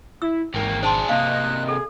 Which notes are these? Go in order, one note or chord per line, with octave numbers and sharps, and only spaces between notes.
E4 E6
G#1 E2 A#3 G5
D4 G#4 C5 A5 C6
C3 A#3 D#5 F5 F#6
G#4 A4